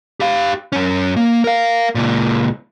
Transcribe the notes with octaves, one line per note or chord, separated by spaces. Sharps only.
G4 F5
F#2 C#4
A#3
A#4 F5
C#2 A#2